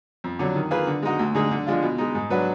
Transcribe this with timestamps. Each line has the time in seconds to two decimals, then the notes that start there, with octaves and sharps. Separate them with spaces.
0.24 F2
0.39 D3 F#3 D4
0.56 D#3
0.71 A#3 F4 G#4 B4
0.87 D3
1.03 G#3 D#4 F#4
1.19 D2
1.35 D3 G#3 D#4 G#4
1.51 D3
1.67 F3 G#3 D4 F4
1.82 B2
1.98 G#3 D#4
2.15 G#2
2.30 F#3 D4 F#4 B4